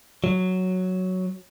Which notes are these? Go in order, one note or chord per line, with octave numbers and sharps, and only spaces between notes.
F#3